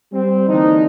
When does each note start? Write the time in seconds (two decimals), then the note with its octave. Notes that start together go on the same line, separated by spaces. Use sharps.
0.12 G3 C4
0.47 D3 E3 A#3 C4 D4 D#4